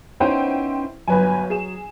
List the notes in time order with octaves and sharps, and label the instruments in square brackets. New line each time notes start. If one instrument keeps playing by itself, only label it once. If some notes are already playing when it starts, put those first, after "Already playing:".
[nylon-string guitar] B3 C#4 D#4 [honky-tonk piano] E4 C5 G5
[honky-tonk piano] G1 B4 G#5 [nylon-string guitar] F#3
[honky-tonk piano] G#4 E7